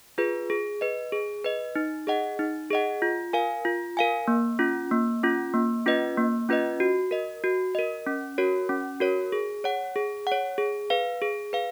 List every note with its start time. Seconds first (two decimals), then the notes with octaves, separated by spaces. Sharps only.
0.18 F4 G#4 B4
0.50 G#4
0.81 B4 D#5
1.12 G#4
1.44 B4 D#5
1.75 D#4
2.07 G#4 D#5 F#5
2.39 D#4
2.71 G#4 D#5 F#5
3.02 F4
3.33 A#4 F5 G#5
3.65 F4
3.97 A#4 F5 G#5
4.28 A#3
4.59 C#4 F4
4.91 A#3
5.23 C#4 F4
5.54 A#3
5.86 C#4 F4 B4 D#5
6.18 A#3
6.49 C#4 F4 B4 D#5
6.80 F#4
7.11 A#4 D#5
7.44 F#4
7.75 A#4 D#5
8.07 C#4
8.38 F#4 A#4 C#5
8.69 C#4
9.00 F#4 A#4 C#5
9.32 G#4
9.64 C#5 F#5
9.96 G#4
10.27 C#5 F#5
10.58 G#4
10.90 B4 F5
11.22 G#4
11.53 B4 F5